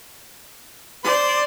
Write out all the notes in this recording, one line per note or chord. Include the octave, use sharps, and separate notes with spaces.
C5 D5 C6